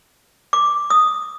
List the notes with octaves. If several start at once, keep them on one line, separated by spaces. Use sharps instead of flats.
D6
D#6